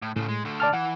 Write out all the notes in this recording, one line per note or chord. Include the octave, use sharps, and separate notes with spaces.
A2
A2 C#3 A3
G#3
D3 A3
D5 A5 F6
E3 F#5